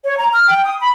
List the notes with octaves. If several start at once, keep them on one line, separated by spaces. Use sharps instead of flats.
C#5
A#5
F6
G5
D#6
B5